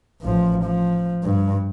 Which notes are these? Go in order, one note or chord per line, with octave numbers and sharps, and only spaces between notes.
A1 F3
F3
G2